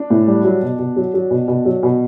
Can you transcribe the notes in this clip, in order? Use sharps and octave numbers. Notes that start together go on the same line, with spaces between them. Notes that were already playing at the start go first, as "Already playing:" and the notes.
Already playing: D4
A2
G3
F#3
B2
B2
F#3
F#3
B2
B2
F#3
B2